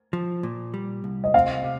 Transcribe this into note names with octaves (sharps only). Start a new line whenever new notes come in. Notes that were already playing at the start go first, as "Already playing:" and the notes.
F3
A#2
G3
C2
D#5
C4 F5
C3